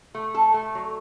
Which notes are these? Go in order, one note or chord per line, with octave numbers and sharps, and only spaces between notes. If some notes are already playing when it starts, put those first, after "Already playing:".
A3
A4
A3
F#3